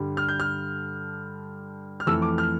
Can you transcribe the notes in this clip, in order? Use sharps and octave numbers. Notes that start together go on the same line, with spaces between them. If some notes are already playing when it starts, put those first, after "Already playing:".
Already playing: G2 D3 G3
F6
G6
F6
F6
F2 E3 A3 E6
D6
F6